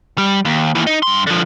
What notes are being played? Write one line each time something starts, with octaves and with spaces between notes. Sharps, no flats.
G3
D#2
D#2 E3
D#4
G2 C6
D3 F3